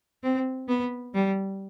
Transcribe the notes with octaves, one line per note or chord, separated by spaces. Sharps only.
C4
B3
G3